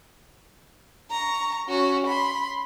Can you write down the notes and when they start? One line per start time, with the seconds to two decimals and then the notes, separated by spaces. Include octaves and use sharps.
1.11 A#5 C#6
1.67 C#4 F#4
2.07 B5 C6